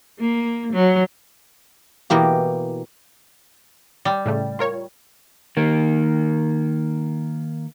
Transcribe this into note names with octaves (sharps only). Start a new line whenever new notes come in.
A#3
F#3
B2 E3 A#3 G4
G3
A2 C#3 A3
F4 A#4 C#5
D#3 A#3